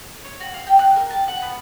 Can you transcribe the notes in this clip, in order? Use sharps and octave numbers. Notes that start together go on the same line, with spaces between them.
C#5
F#4
F5
G4
F#6
A#4
A5
F#5
B3